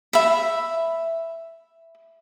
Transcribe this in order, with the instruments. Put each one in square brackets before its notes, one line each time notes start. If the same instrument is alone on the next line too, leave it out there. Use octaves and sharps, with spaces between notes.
[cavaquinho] E5 B5